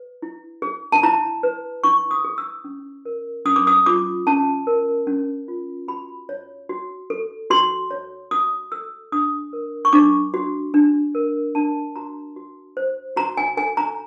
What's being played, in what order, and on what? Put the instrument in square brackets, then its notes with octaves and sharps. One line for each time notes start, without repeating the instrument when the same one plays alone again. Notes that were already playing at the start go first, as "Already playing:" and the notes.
Already playing: [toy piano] B4
E4
G#4
A5
E4 A#5
B4
E4 C#6
D#6
G#4
E6
C#4
A#4
C#4 D#6
D6
D#6
F4 D6
C#4 A5
A#4
C#4
F4
F#4 B5
C#5
F#4
A4
F#4 C6
C#5
F#4 D#6
A4 E6
D4 D#6
A#4
C#6
D4 D6
F#4
D4
A#4
D4 A5
F#4 A#5
F#4
C5
F#4 A#5
G#5
A4 G#5
A#5